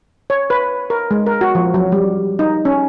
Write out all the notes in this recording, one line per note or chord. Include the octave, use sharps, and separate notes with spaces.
C#5
B4
A#4
G#3
A#4
F#4
F3
F#3
G3
D#4
C#4